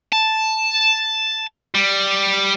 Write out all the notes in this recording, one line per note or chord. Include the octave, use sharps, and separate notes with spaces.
A5
G3